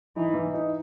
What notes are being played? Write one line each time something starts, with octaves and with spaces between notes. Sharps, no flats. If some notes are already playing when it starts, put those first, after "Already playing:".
E3 D#4
E3
D#4